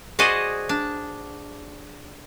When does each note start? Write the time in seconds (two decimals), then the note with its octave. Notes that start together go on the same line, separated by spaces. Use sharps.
0.19 F#4 G#4 C5 D5 D#5
0.69 D4